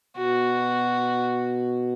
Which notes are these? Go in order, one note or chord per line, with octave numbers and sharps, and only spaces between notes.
B2 F#4